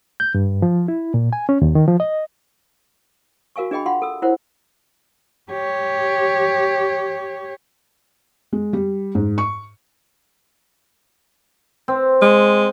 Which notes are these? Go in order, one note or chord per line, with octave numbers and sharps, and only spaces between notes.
G6
G2
F3
E4
A#2
G#5
C#4
D#2
D#3
F3
D#5
F#4 A#4 F5 G#5 C#6
D4 G#4 D#5 G5 B5
F4 F5 F#5 B5 C6
A4 E6
E4 F4 A#4 C5 C#5 F#5
G4 C#5
G#3
G3
G#2
C#6
C4
G#3